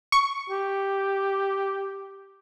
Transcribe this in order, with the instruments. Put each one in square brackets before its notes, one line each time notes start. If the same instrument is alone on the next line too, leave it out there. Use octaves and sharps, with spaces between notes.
[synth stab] C#6
[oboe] G4